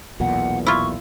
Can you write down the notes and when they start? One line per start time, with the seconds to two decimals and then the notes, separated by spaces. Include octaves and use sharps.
0.20 B1 E2 A#2 F#5
0.67 E4 F4 C#6